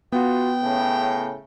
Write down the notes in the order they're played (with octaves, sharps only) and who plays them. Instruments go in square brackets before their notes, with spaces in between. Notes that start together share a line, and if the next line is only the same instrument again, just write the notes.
[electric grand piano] B3 [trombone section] F4 F#4 [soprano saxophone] G5
[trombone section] A2 C#3